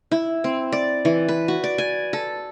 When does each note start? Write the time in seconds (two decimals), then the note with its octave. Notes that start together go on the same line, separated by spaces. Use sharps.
0.11 E4
0.44 C4
0.72 D5
1.05 E3
1.28 B4
1.48 F#4
1.64 D5
1.78 G#5
2.13 A4